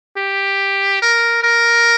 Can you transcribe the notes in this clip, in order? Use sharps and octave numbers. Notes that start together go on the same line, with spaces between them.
G4
A#4
A#4